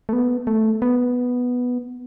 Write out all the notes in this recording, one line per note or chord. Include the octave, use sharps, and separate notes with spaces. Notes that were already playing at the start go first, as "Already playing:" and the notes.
A3
B3
A3
B3